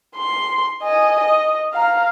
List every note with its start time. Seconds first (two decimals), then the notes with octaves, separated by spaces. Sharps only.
0.16 C6
0.82 D#5 G#5
1.20 D#5
1.73 F5 A#5